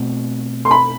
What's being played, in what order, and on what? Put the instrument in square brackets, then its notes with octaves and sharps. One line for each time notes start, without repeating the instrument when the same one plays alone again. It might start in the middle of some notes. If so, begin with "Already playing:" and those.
Already playing: [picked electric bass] B2 A3 C4
[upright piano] C6
B5